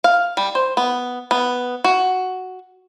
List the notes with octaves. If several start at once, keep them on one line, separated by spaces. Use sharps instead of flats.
F5
G3
C5
B3
B3
F#4